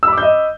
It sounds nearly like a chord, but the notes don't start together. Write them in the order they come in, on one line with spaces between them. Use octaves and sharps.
E6 B5 D6 G6 D#5